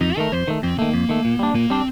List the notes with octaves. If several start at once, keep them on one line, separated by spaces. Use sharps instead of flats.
F2 D#4
D#3 A3 A#4
F2 C5
D#3 A3
F2 C4
D#3 A3 A#3
F2
D#3 A3
A#2
G3 D4
A#2 A#3
G3 C4 D4